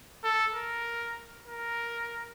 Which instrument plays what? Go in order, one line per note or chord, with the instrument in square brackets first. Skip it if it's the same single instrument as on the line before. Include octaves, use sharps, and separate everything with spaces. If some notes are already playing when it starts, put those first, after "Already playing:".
[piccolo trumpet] A4
A#4
A#4